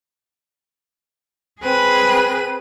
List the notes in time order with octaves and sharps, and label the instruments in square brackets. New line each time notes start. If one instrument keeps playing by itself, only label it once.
[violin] C4 D#7 [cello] G#4 B4